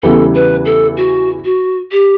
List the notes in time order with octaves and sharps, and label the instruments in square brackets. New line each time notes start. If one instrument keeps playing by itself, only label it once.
[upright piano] E2 C#3 E3 G3 [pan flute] A4
[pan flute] B4
A4
F#4
F#4
G4